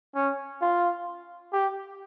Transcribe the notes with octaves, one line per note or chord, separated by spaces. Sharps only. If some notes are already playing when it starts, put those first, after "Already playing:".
C#4
F4
G4